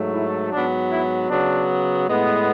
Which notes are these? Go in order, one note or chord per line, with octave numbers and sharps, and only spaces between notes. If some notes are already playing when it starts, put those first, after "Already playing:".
Already playing: G#2 F#3 A3
E4
G#2 F#3 B3 D4
E4
C#3 F#3 B3 D4
A2 G#3 B3